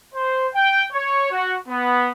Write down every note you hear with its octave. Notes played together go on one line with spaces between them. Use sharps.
C5
G5
C#5
F#4
B3